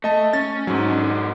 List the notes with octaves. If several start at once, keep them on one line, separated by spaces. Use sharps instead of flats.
A3 D#5 A5
C#4 A6
G#2 F#3
D#3 D4